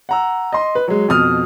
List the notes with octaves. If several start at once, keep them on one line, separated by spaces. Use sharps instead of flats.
F#5 A#5 E6
D#5 C6
B4
F#3 G#3
F2 B2 D#6 F6